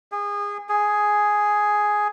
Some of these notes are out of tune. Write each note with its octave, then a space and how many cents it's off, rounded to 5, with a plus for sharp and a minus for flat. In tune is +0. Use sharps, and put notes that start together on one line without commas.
G#4 -25
G#4 +5